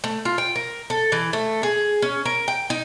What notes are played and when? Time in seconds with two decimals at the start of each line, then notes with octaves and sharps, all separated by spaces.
0.04 A3
0.25 F4
0.38 G5
0.56 A#4
0.90 A4
1.12 E3
1.33 A3
1.63 G#4
2.02 C#4
2.25 A#4
2.48 G5
2.70 D#4